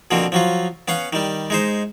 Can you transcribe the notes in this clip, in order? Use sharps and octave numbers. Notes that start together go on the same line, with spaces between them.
B2 D3 F3 A#3 C4
F3 F#3 F4
B3 C#4 F5 F#5
D#3 G3
G#3 D#4 C5